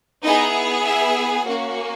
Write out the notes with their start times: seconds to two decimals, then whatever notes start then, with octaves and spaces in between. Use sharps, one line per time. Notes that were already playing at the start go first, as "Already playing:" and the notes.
0.23 B3 D#4 E4 G#4 D#5
0.84 E4 E5
1.45 A#3 C#4 F#4